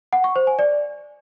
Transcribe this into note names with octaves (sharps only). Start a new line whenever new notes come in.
F#5
C#6
C5
G#5
D5